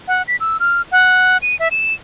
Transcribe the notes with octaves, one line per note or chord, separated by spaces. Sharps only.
F#5
B6
E6
F6
F#5
D#7
E5
E7